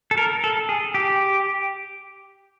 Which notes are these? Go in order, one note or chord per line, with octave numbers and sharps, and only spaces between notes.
A4
A#4
A4
G#4
G4